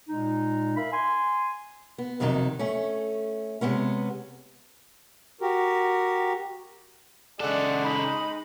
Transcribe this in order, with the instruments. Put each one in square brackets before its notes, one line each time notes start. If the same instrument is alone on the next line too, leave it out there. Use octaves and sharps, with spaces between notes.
[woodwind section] A#2 G#3 D#4
A#4 E5 F5 B5
G#5 C6
[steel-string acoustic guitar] B3
F2 C3 D#3 F#3 D#4
A3 C#4
C3 G#3 B3 C#4
[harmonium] F#4 G4 A#4
[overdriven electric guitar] C#3 A4 [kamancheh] G#3 [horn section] D5 E5 F#5
[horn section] D#4 [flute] B5